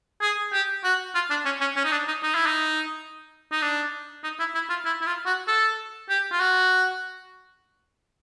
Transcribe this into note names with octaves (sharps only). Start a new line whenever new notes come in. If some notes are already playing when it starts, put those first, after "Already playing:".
G#4
G4
F#4
F4
D4
C#4
C#4
C#4
D#4
D4
D#4
D#4
E4
D#4
D#4
D4
D#4
E4
E4
F4
E4
E4
F4
F#4
A4
G4
F4
F#4